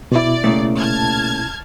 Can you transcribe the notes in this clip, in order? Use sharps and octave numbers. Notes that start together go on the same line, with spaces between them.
B2 E4 D5
A#2 C#3 A3
A5 F6 G#6